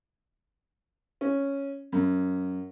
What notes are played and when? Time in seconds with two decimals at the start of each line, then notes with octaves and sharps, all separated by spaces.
1.21 C#4
1.92 F#2